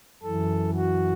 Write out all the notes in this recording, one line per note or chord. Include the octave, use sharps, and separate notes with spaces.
F#2 E3 A4
F#4